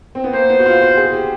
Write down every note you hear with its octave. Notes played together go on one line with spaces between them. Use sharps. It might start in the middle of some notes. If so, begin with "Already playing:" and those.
C4
B3
A#3 C5
B3
F#4
F4
F#4
G#4
G4